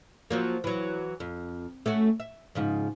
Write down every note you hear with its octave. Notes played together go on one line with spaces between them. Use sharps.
F3 F#3 A#3
E3 F#3
F2
A3 C#4 F#4
E5
G#2 C#3 F3